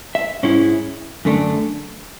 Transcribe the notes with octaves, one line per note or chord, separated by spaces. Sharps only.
E5
G#2 G#3 C#4 E4
F#2 D3 A3 D4